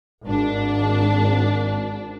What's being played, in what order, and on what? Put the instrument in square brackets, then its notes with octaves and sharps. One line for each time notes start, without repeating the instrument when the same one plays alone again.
[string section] G#1 D4